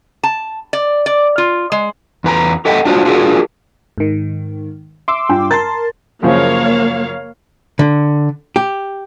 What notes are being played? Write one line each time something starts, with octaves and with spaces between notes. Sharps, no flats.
A5
D5
D5
F4
G#3
E2 B4 A#5
G4 A4 D#5 E5 F#5 G5
D4 F4 F#4 C5
D4 F4 F#4 G#4 A#4
G#2 D#3
E5 C6 D6 E6
G2 F4 G5
A#4 A5 C6 A6
F#2 C#3 F3 A#3 C#5 F5
D3
G4